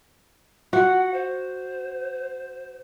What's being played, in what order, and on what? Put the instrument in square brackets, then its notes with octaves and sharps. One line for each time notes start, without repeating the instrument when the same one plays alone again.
[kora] F#4 [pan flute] F#5
[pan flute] C5